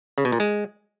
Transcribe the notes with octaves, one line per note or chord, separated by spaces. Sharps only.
C#3
B2
A#2
G#3